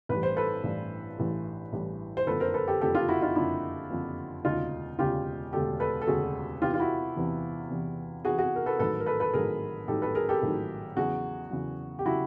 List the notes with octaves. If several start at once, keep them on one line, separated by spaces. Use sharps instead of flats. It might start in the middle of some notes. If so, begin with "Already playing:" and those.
A1 G2 E3 G3 B4
C5
A4 B4
A1 G2 E3 G3
A1 G2 E3 G3
A1 G2 E3 G3
C5
F#1 F2 D3 A4 B4
A#4 C5
A4 B4
G4 A4
F#1 F2 D3 G4 A4
F4 G4
E4 F#4
D#4 F4
F#1 F2 D3 D4 E4
F#1 F2 D3
E1 D2 C#3 D#4 F4
E1 D2 C#3 F4 G4
E1 D2 C#3 G4 A4
A4 B4
A4
E1 D2 C#3 F#4 G#4
E2 C3 E3 F4 G4
F4
E4 F#4
E2 C3 E3
E2 C3 E3
E2 C3 E3 F#4 G#4
F#4 G#4
A#4
A4 B4
A1 G#2 D#3 F#3 A4 B4
A#4
A4 B4
A4 B4
A1 G#2 D#3 F#3 G#4 A#4
A1 G#2 D#3 F#3 G4 A4
A4 B4
G#4 A#4
G4 A4
A1 G#2 D#3 F#3
E2 C#3 F#3 F#4 G#4
E2 C#3 F#3
G4
C#3 F#3 E4 F#4